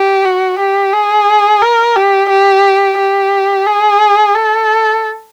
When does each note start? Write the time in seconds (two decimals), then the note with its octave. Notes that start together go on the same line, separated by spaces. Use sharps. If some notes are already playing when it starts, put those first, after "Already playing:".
Already playing: G4
0.25 F#4
0.59 G4
0.93 G#4
1.62 A#4
1.96 G4
2.30 G4
2.98 G4
3.66 G#4
4.34 A4